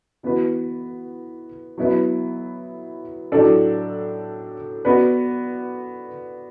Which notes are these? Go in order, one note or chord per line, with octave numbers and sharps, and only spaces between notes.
E3 B3 F#4 B4
F#3 B3 E4 B4
A2 F#3 D4 A4 D5
B3 F#4 B4 D5